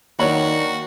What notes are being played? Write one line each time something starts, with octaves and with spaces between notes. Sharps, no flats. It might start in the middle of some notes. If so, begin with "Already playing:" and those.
D#3 F#3 A#3 D4 F#4 C#5 B5